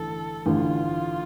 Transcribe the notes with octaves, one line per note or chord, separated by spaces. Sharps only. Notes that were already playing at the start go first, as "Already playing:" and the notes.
Already playing: A1 G2 D3 A4
A1 G2 D3 F4